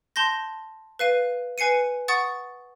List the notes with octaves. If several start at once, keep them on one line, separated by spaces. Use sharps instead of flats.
A5 C6 G6 A#6
B4 F5 D#7
B4 G#5 C7 C#7 D#7
F#5 C#6 D#6 A6